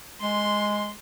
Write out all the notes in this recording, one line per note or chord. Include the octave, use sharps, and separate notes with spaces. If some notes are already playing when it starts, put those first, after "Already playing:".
G#3 C6